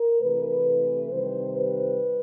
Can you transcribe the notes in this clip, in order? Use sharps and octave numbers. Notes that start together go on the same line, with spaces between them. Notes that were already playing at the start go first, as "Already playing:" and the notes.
Already playing: A#4
C3 E3 A3 B4
C3 D#3 G3 C5
B4